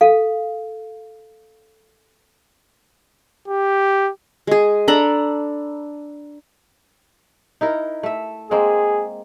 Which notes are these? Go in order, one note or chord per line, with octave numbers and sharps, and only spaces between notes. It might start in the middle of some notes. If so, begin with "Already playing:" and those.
A4 F5
G4
G#3 G#4
D4 A4 A#5 B5
D#4 E4 A#4
A3 E5
G#3 A#3 C4 G#4